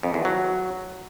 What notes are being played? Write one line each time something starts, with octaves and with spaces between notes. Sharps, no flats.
F2
E2
F#3